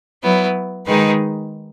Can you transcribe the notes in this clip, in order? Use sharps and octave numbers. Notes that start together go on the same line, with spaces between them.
F#3 B3 E4
D#3 G#3 D#4 G#4 B4